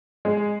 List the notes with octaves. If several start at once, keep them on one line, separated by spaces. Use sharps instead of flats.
G#3